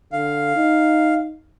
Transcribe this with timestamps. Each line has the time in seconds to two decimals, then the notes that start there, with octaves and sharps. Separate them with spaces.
0.13 D3 F5
0.56 D#4